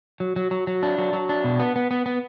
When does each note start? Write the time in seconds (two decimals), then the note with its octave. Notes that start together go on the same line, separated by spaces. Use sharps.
0.20 F#3
0.36 F#3
0.51 F#3
0.67 F#3
0.83 D4
0.98 F#3
1.13 F#3
1.29 D4
1.44 B2
1.60 B3
1.76 B3
1.91 B3
2.06 B3